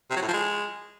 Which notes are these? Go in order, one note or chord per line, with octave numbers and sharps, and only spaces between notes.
C3
F#3
A2
F3
G#3